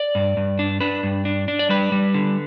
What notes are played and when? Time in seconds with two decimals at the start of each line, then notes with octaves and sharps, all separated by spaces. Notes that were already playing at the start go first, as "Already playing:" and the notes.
Already playing: D5
0.15 G2
0.37 G2
0.59 D4
0.81 D4 B4
1.03 G2
1.25 D4
1.48 D4
1.59 D5
1.69 G3 B4
1.92 G3
2.14 D3